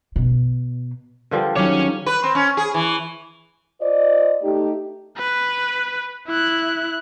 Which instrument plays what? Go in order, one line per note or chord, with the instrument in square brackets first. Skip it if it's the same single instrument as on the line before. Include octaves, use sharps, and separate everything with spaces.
[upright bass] B2
[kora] D3 F3 G3 [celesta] A#4 B4 G5
[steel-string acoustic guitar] D#3 F#3 [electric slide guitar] C#4 C#5 [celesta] D6
[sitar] B4
C4
C#4
G#4
E3
[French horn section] F4 C5 D5 D#5
A3 D#4 G4
[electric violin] B4
E4 F#6